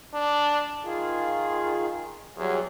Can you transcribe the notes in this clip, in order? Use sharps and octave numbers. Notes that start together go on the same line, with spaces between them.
D4
D#3 F4 G#4
E2 F#3 G3 G#4